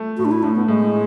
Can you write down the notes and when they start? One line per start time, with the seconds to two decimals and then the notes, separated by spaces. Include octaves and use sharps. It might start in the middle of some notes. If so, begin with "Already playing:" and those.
Already playing: A3
0.18 A2 F#4
0.25 D4
0.31 E4
0.43 A2 D4
0.56 B3
0.68 A2 G#3